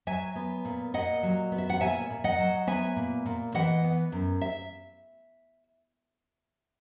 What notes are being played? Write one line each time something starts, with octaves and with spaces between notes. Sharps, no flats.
F#3 E5 G#5
B3
A#2
A#2 D#5 F#5
F#3
B3
E5
F#5
A#2 E5 G#5
A#2
D#5 F#5
F#3
B3 E5 G#5
A#2
A#2
E3 D#5 F#5
B3
F#2
E5